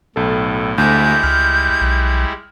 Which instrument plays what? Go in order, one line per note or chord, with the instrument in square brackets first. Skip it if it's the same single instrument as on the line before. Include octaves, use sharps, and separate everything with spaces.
[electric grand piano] B1 A4 [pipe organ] A2
[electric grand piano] D2 [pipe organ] G3 G#3 E4 [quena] G6
[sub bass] C#2 [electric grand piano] F6
[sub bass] B1